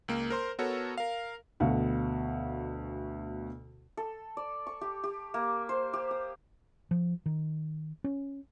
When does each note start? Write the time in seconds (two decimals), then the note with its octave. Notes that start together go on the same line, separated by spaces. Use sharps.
0.08 C#2 A#3
0.30 A#4 C5 C6
0.59 B3 F#4 A4 A#4 C#5
0.98 A#4 F5
1.60 D2 B2 F#4 F5
3.97 A4
4.37 D5
4.67 C#6
4.81 G4
5.04 G4
5.34 A#3
5.69 C5
5.93 G4
6.11 D#6
6.91 F3
7.26 D#3
8.04 C#4